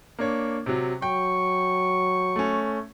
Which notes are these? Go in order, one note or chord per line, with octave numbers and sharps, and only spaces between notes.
A#3 D4 C#5
C3 F#3
F#3 G5 C#6
A3 C#4